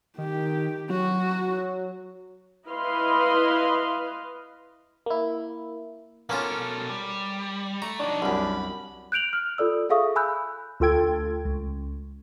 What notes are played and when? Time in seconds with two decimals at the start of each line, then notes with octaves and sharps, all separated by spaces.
0.18 D#3 G4
0.90 F#3 F#4
2.67 E4 B4 D#5 F5 C6
5.06 A#3 E4
6.29 B2 A#3 C#4 F4 A4
6.89 G3
7.82 A3 A#5
8.00 F#3 D4 D#4
8.22 C2 F#2 B5
9.12 F#6 G6 D7 F7 F#7
9.33 F6
9.58 F4 A4 D5 E6
9.89 G#4 A4 E5 F5 C#6 D#6
10.16 G#5 B5 E6 F#6 G6
10.80 D2 F4 A4 G5 G#6
11.45 C#2